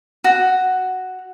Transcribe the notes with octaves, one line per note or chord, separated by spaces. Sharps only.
F#4